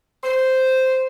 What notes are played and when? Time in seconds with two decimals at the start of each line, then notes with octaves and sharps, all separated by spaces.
0.24 C5